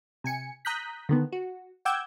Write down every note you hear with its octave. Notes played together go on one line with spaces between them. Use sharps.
C3 G#5 C#7
A#5 D#6 F#6 G6 B6
D3 D#3 B3
F#4
F#5 G5 D6 E6 G6 G#6